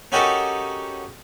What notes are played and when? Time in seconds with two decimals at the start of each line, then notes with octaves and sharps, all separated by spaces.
0.12 C#4 D#4 F#4 G4 A4 A#4